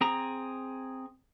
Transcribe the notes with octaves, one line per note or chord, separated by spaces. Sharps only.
C4 G#4 A#5